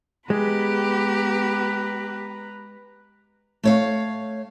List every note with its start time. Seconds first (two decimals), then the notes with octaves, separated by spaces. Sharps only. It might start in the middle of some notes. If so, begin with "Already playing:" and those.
0.30 G#3 B3 G4 B4 A#5 B5
3.64 A3 C#5 F5